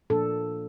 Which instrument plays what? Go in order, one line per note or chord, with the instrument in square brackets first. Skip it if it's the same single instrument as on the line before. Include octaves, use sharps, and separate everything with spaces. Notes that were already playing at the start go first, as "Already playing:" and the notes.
[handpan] A#2 F3 A#3 D4 A4